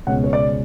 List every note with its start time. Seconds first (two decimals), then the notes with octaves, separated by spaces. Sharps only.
0.07 C#2 B2 G#3 C#4 F#5
0.24 C#5
0.33 D5